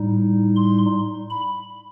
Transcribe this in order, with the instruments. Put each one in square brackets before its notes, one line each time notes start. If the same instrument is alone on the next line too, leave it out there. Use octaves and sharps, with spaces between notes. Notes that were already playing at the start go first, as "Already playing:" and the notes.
Already playing: [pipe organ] A2 G3 D#4
C6
B5